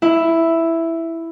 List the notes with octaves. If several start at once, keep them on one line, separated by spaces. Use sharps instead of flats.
E4